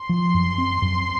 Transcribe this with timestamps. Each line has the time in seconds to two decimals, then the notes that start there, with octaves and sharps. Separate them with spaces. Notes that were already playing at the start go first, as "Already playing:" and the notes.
Already playing: C6
0.09 F3
0.34 F#2
0.58 C4
0.82 F#2